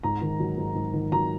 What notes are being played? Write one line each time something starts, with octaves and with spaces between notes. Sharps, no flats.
G#2 A#5
D#3
F#3
G#2
G#2
D#3
F#3 A#5